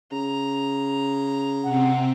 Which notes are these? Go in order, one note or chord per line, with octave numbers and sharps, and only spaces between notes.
C#3 A#5
C3 C4 F#5